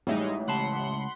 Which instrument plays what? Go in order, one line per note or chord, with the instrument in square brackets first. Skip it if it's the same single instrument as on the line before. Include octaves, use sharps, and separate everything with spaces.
[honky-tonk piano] A1 E5 [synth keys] G3 G#3 D#4
[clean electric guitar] C#2 A5 [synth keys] F#5 B5 C6